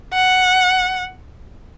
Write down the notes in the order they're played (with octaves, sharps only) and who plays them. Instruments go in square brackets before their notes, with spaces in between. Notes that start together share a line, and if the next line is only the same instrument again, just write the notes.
[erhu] F#5